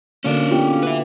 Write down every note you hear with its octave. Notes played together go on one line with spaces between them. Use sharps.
B2 D3 A#3 C#4 D5
B3 F4 G4
B4 E5